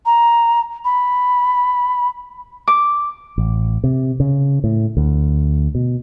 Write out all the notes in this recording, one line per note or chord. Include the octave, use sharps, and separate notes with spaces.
A#5
B5
D6
A1
C3
C#3
A2
D2
B2